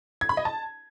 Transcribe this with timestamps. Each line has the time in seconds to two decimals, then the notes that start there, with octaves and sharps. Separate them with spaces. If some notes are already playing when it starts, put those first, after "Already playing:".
0.21 G#6
0.29 B5
0.37 D#5
0.45 A5